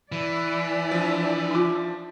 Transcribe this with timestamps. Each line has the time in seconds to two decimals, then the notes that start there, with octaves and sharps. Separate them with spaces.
0.12 E3 D5 E5
0.91 F3 D4
1.51 D#4 F4